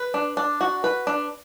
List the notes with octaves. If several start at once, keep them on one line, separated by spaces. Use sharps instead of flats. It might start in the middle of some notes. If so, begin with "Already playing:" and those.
Already playing: B4
D4
D4
F#4
B4
D4